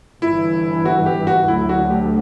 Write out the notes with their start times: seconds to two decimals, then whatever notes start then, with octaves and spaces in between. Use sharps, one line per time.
0.22 G1 G2 E3 E4
0.85 F#4
1.06 G4
1.27 F#4
1.48 D2 D3 F#3 E4
1.69 F#4
1.90 G4